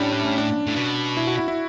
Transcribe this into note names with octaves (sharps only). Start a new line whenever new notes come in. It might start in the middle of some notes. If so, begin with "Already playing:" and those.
Already playing: A2 G3 C#4 D4
D4
C#4
D4
A2
B2
E4
F#4
E4
E4